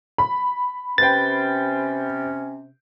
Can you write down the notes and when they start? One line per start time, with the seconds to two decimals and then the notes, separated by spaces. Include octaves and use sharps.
0.18 B5
0.98 C3 C#4 B4 C5 G5 A6